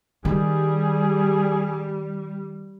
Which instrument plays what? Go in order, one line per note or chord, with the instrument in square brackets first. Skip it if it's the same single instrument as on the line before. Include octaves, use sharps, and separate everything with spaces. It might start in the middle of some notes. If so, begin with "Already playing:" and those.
[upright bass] D#3 [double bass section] G3 [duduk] G#4